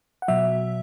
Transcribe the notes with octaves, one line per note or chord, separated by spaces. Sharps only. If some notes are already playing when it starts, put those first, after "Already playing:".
F#5
B2 F#3 E5